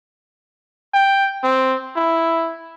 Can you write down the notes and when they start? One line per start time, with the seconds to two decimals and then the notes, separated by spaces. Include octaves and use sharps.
0.94 G5
1.44 C4
1.96 E4